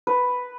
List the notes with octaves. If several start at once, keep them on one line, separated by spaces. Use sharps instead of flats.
B4